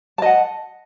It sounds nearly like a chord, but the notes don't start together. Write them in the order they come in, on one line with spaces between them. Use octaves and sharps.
A5 D#5 F#5